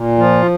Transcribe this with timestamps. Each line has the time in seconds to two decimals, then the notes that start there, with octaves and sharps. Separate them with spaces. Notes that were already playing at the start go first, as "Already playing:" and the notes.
Already playing: A#2
0.18 F3 F4